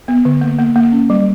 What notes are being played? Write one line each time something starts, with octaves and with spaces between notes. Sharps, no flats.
B3
D3
A#3
A#3
A#3
C#4
G3